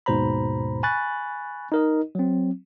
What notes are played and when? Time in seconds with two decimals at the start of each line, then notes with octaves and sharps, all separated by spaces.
0.06 D#2 G#2 B2 C5 A#5 B5
0.83 G#5 B5 C#6 F#6 A6
1.72 D#4 A#4 D#5
2.15 F#3 C4